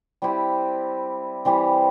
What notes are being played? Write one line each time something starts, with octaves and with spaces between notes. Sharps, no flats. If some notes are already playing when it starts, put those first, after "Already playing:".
G3 C4 E4 G4
E3 G3 C4 G4